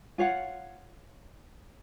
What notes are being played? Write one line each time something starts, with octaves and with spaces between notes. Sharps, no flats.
F4 C#5 F5 F#5